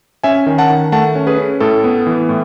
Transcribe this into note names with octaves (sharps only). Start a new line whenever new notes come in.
C#4 E5 G#5
D#3
F#5 A5
D#3
A3 F#5 A5
C#4
G#4 B4
C#4
A2 A4
B3
E3
A2